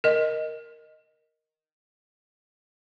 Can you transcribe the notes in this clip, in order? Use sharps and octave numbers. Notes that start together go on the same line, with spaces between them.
A#4 D#5